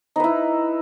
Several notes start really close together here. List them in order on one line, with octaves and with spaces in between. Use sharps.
D#4 B4 E4